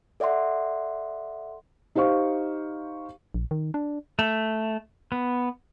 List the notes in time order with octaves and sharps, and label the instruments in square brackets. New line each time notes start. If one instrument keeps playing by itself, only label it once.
[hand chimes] A4 D5 E5 F#5 C6
[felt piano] D#4 G4 C5 F5 C#6
[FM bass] A#1
D#3
D4
[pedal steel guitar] A3
B3